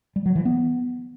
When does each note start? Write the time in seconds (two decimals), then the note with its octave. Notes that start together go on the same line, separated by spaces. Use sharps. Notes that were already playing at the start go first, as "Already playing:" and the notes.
0.16 G3
0.26 F#3
0.35 E3
0.45 B3